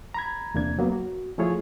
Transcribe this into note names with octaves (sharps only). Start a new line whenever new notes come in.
A#5 B5 G#6
E2 C3 A#3 D4 G#6
F#3 A#3 B3
F#4
F3 A3 E4 F4 G#4 C#5